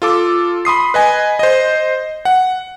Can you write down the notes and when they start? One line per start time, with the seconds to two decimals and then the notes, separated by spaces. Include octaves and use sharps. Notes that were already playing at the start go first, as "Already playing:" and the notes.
0.02 F4 A4 D6
0.65 B5 C6 D#6 C7
0.94 B4 D#5 G#5
1.39 C5 D#5
2.25 F#5